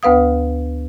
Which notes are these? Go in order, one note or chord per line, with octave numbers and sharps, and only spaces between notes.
D2 B3 B4 F5 D#6